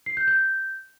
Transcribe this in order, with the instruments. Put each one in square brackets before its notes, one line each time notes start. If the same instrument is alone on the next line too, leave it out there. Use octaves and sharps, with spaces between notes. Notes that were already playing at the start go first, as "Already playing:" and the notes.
[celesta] C7
G6
G6